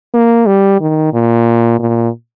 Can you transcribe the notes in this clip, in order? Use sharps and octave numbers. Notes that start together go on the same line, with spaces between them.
A#3
G3
D#3
A#2
A#2